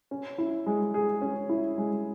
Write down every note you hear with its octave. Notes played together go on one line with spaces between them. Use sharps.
C#4
E4
G#3
G#4
C#4
E4
G#3